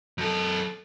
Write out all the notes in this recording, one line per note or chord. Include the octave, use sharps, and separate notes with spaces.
F#2 A4